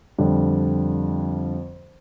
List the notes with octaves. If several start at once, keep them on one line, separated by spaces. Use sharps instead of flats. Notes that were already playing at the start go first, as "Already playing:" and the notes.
F2 D3 G3